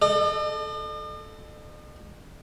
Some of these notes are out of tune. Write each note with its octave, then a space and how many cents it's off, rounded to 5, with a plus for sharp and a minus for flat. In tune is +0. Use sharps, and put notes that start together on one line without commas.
A4 -10 D#5 -45